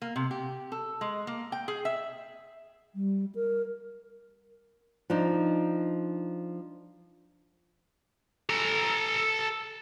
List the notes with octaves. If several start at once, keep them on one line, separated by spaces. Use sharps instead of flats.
A#3
C3
G4
A4
G#3
A#3
G5
G#4
E5
G3
A#4
F3 D4 D#4
A4 A#5